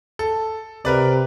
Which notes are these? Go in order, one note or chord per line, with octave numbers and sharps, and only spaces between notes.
A4
C3 A#4 B4 D5